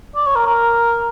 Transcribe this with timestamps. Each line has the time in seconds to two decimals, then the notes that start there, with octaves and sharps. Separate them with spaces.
0.15 D5
0.26 C#5
0.36 A#4
0.46 A#4